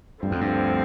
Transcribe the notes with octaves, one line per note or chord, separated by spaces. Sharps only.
D2 G2 D3 F3 C4
F2
G2